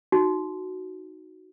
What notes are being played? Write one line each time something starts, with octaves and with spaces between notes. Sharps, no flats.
D#4 F#4